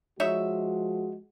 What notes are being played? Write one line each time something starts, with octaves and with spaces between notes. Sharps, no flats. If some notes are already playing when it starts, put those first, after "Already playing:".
F3 G#3 D#4 F#4 C#5 E5